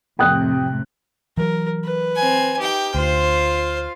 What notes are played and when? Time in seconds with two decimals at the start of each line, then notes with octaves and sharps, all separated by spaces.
0.19 F2 A2 C3 G5 D#6 F#6
1.37 E3 F#3 A#4
1.84 B4
2.15 C4 G#5
2.59 D#4 G4 G5
2.95 D2 F4 C5 F5